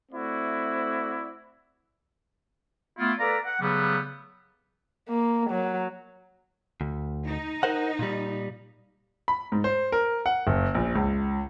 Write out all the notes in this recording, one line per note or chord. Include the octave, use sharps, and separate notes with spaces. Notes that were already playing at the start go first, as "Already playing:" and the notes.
A3 C4 E4 F#4 D5
A3 B3 E4 F4
A4 B4 D5 F5 A#5
F#5
C#3 F#3 G3 A3 B3
A#3
F#3
D2
D#4
A#4 C5 F#5
A#2 G3
B5
G#2
C5
A#4
F#5
F#1
A#1
C#2